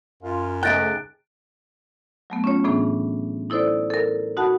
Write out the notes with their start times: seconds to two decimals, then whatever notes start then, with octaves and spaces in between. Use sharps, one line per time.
0.23 F#2 F4
0.63 C#2 G#2 A3 D#5 G5 F#6 A6 D7
2.30 F#3 A3 B3
2.44 C#4 F4 C#5
2.64 A2 E3 B3 D4 G#4
3.50 D#4 E4 A4 C5 D5
3.90 A4 A#4
4.37 D#4 F#4 F#5 A5 B5